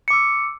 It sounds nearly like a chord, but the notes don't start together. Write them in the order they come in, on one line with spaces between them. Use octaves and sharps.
C#7 D6 E6